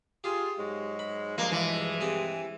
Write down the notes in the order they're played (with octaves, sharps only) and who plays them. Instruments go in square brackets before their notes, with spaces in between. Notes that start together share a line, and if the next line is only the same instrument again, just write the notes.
[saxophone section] F4 G#4 [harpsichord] G4
[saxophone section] G#2 F#3 G#3
[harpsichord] B5
[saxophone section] G2 B2 G#3 [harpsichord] F3 F5 [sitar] A#3
[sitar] E3
[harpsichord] C4 G4 G#4